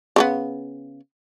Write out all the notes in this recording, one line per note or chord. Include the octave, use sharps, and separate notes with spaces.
C#3 A3 B3